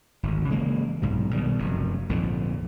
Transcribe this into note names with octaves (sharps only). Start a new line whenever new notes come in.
G#1 D2
C#3 E3 G#3 A#3
B1 G#2 C3
B2 D#3 G3
F1 F#2
A#1 F2 G#2 D3